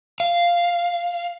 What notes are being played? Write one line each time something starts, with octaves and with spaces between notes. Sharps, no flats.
F5